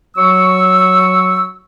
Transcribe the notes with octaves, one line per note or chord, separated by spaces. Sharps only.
F#3 C#6 E6